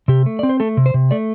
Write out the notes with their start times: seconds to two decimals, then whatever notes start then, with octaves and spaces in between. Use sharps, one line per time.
0.08 C3 G4
0.26 A3
0.39 C4 D5
0.49 C5
0.60 A3 A4
0.77 C3
0.86 C5
0.94 C3
1.11 A3 D5